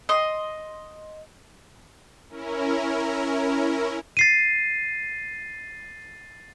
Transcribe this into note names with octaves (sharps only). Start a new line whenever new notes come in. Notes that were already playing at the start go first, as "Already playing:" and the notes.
D#5 C6
C#4 E4 A#4
A6 C7 D#7